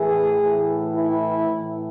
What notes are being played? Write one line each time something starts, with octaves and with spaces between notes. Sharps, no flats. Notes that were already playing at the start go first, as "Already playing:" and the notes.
Already playing: A2 E3 G#4
A2 E3
E4
A2 E3